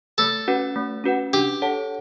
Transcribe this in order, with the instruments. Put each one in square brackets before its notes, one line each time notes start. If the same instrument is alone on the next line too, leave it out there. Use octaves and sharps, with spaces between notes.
[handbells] A3 [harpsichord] A4
[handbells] C#4 F#4 B4 F#5
A3
C#4 F#4 B4 F#5
[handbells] D4 [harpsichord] G4
[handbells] A4 C#5 F#5 A5